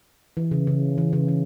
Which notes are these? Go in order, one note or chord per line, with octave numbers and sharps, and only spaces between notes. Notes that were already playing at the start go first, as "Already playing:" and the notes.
E3
C#3
C#3
E3
C#3
E3